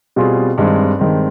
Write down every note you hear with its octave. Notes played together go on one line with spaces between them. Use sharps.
B2 G3 C4 F4 G#4
G2 D#3 G#3 C4
G2 D#3 G#3 C4